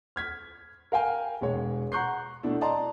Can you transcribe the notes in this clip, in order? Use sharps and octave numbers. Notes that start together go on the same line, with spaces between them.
F6 G#6 B6
A#4 F5 G5 G#5
E1 G#3 C#5
F#5 A#5 C#6 F#6 G6 C7
B2 A3 D4 E4
D5 D#5 A5 A#5 C6